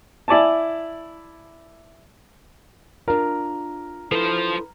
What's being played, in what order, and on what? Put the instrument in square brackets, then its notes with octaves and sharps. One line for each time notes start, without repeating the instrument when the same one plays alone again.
[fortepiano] E4 D5 G#5 A5
[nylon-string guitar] D4 F4 [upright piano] A#4
[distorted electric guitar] F3 C5 [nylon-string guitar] E4 A4 B4